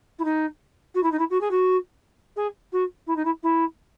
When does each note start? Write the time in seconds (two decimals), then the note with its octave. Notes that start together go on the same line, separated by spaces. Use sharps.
0.19 E4
0.24 D#4
0.95 F#4
1.03 E4
1.12 D#4
1.19 E4
1.30 F#4
1.41 G#4
1.51 F#4
2.36 G#4
2.73 F#4
3.07 E4
3.16 D#4
3.25 E4
3.43 E4